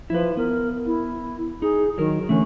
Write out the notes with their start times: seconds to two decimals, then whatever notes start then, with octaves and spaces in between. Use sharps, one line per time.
0.10 F3 E4 B4
0.37 B3 A#4
0.86 E4
1.62 D#4 G#4
1.98 D#3 F#3 A#4
2.29 D3 E3 A3 C#4